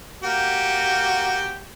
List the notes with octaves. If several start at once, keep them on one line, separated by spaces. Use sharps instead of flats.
A#3 F#4 G4